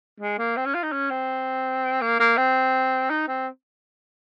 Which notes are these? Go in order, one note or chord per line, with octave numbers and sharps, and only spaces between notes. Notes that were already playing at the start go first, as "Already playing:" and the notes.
G#3
A#3
C4
C#4
F4
D#4
C#4
C4
A#3
A#3
C4
D#4
C4